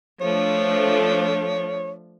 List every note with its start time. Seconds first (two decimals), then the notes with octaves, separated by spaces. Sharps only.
0.21 F3 A3 D4 C#5